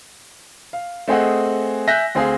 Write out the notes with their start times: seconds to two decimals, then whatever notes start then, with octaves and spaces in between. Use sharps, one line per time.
0.73 F5
1.08 A3 C4 G#4 D#5 F#5
1.87 E5 G#5 F#6 G6 A#6 B6
2.15 D2 C4 G#4 F5